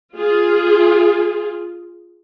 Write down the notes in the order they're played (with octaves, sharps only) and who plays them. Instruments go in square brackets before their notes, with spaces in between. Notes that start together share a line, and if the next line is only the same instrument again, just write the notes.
[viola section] F4 G#4